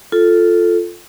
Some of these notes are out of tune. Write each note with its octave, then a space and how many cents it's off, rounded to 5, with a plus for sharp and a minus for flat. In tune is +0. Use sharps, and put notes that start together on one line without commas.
F4 +0 A4 +0